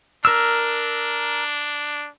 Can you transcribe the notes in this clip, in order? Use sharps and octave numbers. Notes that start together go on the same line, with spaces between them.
D4 A#4 E6